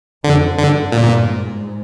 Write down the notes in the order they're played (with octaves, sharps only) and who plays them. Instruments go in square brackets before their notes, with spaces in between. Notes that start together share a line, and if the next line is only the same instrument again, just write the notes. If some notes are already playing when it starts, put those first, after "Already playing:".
[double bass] F2 [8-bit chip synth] D3
[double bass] G2 [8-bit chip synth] D3
[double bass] G2 [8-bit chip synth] A#2
[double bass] G#2